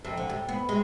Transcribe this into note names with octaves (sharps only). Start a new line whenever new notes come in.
F2
D3
G3
B3
G#3